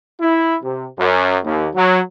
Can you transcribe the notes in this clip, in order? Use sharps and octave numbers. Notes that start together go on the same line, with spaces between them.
E4
C3
F#2
D#2
F#3